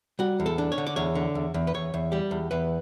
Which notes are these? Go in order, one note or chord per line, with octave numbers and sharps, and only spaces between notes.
G3 F#4
E2
A4
D4
C#5
D3
D5
E2 C#5
D3
E2
E2
B4
E2 C#5
E2
G3 G4
E2
E2 B4